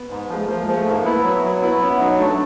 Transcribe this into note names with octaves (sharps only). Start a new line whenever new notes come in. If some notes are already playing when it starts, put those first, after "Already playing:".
Already playing: B3
G#2
F3 G#3
A3
F3 A#3
G#3
F3
A3
G#2
A#3
B3 E4
F#3
F#3
B3 E4
B3 C#4
F#3 D#4
A3 D4